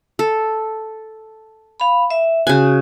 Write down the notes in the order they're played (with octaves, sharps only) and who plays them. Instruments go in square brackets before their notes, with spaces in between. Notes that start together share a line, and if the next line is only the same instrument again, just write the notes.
[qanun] A4
[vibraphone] F5 B5
E5
[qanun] C#3 G#5 [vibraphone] F#4